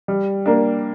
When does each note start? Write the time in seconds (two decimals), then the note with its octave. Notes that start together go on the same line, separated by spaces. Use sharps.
0.08 G3
0.46 A#3 D4